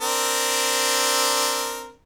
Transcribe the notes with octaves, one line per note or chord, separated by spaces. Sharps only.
C4 D4 A#4